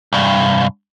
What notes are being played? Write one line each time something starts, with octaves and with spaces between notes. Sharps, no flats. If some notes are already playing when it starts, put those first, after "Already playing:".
C2 G2